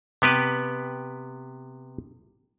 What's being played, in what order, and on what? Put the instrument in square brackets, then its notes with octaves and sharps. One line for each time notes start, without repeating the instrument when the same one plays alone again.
[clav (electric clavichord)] C3 B3 G4 B4